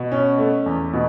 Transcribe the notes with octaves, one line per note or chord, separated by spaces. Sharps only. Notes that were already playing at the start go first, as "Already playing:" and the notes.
Already playing: B2
C#4
A3
E2
B2